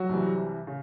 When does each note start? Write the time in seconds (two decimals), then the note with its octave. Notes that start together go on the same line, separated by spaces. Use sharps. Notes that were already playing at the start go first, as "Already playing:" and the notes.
Already playing: F#3 F#4
0.09 C2 C3 E3 G3
0.67 C#3